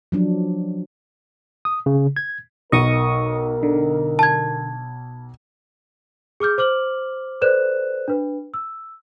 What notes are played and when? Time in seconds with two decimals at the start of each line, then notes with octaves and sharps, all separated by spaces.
0.12 F3 F#3 D4
1.65 D#6
1.86 C#3
2.16 G#6
2.72 B1 D#4 A#4 D#5 C#6 D#6
3.63 D3
4.19 A5 G#6
6.40 G#4 D6 F6 G6
6.58 C5 D6 F6 F#7
7.41 A4 B4 C5 D5 F#6 E7
8.08 D4 B4
8.54 E6